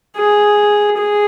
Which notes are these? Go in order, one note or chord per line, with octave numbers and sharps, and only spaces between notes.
G#4
G#4